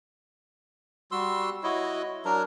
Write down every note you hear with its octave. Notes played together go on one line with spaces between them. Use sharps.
G3 F#4 C6 E6
E4 F#4 C#5 D#5
F#3 D4 A#4 A#5